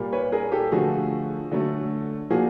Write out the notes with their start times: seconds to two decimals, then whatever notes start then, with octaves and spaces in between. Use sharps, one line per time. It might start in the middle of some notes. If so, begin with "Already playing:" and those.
Already playing: A#2 G3 A#3
0.13 B4 C#5
0.32 G#4 A#4
0.52 G4 A4
0.72 D3 F3 A3 F#4 G#4
1.51 D3 F#3 A3
2.30 A#2 F3 A#3 F#4 G#4